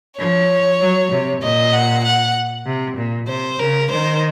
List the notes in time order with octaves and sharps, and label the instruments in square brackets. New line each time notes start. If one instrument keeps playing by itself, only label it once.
[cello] F3 [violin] C#5
[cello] F#3
C3
[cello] A#2 [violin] D#5
[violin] F#5
F#5
[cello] C3
A#2
[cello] C3 [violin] C5
[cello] C#3 [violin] A#4
[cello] D#3 [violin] C5